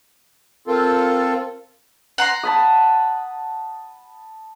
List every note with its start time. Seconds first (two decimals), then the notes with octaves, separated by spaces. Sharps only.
0.68 C4 F4 A4 A#4
2.18 F#5 A#5 C6
2.43 A5 B5 D#6